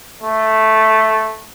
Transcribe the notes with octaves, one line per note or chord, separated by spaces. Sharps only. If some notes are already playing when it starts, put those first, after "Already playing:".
A3